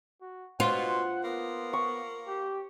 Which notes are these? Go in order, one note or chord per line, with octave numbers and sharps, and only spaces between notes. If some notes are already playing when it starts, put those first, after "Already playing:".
F#4
B2 F4 C5 F#5
A#3 B3
C#6
G4